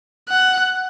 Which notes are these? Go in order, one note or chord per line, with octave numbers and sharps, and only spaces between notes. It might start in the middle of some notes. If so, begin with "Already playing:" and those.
F#5